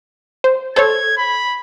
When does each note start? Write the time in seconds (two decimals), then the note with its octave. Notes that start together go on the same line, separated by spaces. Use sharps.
0.44 C5
0.76 A4 C5 C#5 G#6
1.17 B5